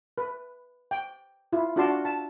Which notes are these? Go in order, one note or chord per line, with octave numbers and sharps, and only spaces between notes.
B4
G5
E4 F4
D4 F4 F#4 D5 A5 C6
A5